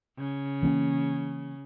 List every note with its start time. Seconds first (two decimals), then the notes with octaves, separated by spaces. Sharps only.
0.18 C#3
0.63 E3 A#3 C#4